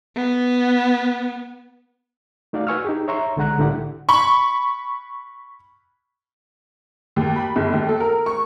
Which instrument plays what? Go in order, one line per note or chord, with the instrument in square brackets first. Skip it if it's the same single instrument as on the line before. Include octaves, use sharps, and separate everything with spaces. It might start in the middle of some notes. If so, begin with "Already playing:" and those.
[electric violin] B3
[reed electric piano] A3 D#4 F#4 D5 F5
F#4 B4 G#5 C#6 E6 F6
D#4 G4 G#4
C#5 E5 A#5 C6 C#6
C2 D3 G#3 F#5 A#5 F#6
C2 A2 D3 E4 G4 F#5
[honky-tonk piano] B5 C#6
D#2
B5
G1
D#2
A4
A#4
C#6